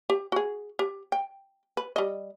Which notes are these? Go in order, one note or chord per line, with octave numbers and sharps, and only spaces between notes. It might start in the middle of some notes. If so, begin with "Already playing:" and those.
G4
F#4 G#4
G4
G5
B4
G3 D#5